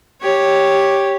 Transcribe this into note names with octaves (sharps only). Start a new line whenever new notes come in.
G4 C#5